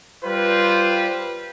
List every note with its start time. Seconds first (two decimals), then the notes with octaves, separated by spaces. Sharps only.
0.24 G3 F4 B4 C5